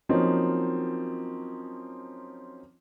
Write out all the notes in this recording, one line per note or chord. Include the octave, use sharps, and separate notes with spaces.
F3 F#3 A#3 C4 C#4 D#4